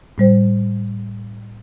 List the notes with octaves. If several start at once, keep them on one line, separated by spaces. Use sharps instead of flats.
A2 G3 C5